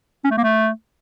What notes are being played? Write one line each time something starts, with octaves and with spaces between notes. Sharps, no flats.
C#4
A3
A#3
A3